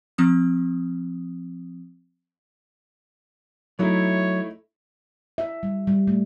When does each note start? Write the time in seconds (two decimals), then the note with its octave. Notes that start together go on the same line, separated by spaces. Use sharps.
0.18 F3 C4 D#6
3.79 F#3 A3 D#4 E4 C#5
5.38 E5
5.63 G3
5.87 G3
6.07 A3